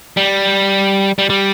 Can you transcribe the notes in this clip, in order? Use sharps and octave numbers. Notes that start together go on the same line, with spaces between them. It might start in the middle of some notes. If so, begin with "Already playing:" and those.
G3
G3
G3